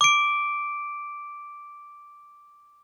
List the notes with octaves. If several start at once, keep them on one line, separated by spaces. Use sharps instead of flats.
D6 D7